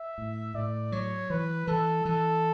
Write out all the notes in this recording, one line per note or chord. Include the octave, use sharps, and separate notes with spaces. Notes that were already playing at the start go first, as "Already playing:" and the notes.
Already playing: E5
A2
A2 D5
F#3 C#5
E3 B4
E3 A4
E3 A4